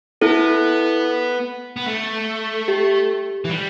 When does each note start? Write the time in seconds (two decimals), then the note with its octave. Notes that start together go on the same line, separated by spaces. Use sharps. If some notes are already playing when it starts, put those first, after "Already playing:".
0.22 B3 E4 A4
1.76 B3
1.86 A3
2.68 G4
3.45 E3
3.50 G3